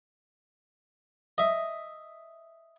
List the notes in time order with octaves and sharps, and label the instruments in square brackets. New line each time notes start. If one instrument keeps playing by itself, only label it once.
[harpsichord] D#5 E5